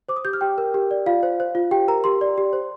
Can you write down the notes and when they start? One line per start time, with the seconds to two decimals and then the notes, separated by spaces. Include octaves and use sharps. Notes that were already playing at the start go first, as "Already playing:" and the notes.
0.09 C5 D6
0.16 D#6
0.25 G4 G6
0.33 F6
0.41 G4 G5
0.58 A#4
0.74 G4
0.91 D5
1.06 F4 F5
1.23 C5
1.40 C5
1.55 F4
1.71 G4 G5
1.88 A#4 A#5
2.04 G4 C6
2.21 D5
2.38 G4
2.53 C5